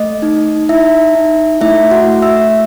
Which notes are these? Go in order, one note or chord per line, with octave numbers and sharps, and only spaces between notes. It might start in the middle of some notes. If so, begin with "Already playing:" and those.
Already playing: A3 D#5
D#4
D#4 E4 E5
D#4
A3 E4 E5
F#4 F#5
A3
E5 E6